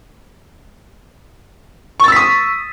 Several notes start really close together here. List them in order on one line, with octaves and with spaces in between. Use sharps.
C#6 A6 E6 B6 D#6